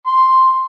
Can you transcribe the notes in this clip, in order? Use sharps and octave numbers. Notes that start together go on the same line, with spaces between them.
C6